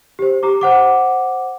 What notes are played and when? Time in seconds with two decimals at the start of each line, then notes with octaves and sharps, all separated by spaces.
0.19 G4 C5
0.43 G4 A#5 D6
0.61 C5 F#5 D6